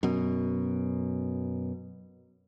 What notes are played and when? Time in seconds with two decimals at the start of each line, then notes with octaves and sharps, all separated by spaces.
0.03 F#2 B2